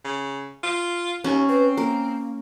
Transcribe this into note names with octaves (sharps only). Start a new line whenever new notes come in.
C#3
F4
D#2 C#4
C4 B4
A#3 A#4